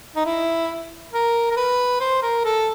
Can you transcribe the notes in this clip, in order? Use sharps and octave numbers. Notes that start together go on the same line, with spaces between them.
D#4
E4
A#4
A#4
B4
C5
A#4
A4